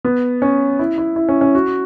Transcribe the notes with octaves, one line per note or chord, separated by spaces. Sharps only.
B3
C#4
E4
E4
E4
C#4
C#4
F#4